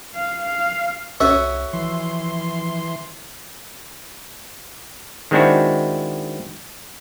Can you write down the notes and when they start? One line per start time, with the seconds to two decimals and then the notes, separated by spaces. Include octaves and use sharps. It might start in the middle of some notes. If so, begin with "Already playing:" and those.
0.14 F5
0.45 F5
1.20 C2 C#4 F#4 A4 E5
1.73 E3 F3 C6
5.31 D#3 G#3 C4 D4 E4 F#4